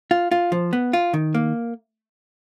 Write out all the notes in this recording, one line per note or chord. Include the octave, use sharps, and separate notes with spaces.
F4
F4
F3
B3
F4
D#3
A#3